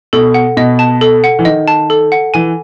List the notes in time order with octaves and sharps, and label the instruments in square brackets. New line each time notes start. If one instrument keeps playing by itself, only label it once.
[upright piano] B2 [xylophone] A4
[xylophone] F#5
[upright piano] B2 [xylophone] D#5
[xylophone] A5
A4
F#5
[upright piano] E3
[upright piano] D#3 [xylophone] D#5
[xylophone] A5
A4
F#5
[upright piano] E3 [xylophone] G#5